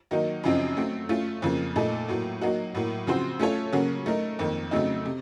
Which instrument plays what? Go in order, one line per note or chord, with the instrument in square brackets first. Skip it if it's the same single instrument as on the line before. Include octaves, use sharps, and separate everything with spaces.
[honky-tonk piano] D#3 F#3 A#3 D#4
F#2 C#3 F3 C4 D#4
F#3 A3 C4
A3 C#4 F4
F2 C#3 F3 A#3
A#2 A3 D#4 A4
A2 F#3 A#3
F#3 A#3 D#4 F#4
A2 F#3 A#3
C#3 F3 C4 F#4 C5
A3 C#4 F4 A4 C#5
C#3 F#3 A#3 C#4 F#4
A3 D#4 A#4
F2 D#3 A#3
C#3 F#3 A3 C4 D#4
C3